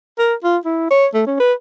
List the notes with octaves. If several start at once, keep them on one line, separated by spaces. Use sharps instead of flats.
A#4
F4
E4
C#5
A3
C#4
B4